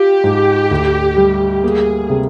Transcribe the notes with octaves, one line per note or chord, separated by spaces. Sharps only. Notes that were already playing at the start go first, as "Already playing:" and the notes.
Already playing: F4 G4
G#2
D2
G3
A#3 G#4
C3